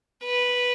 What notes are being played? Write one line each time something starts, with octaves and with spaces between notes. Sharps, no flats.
B4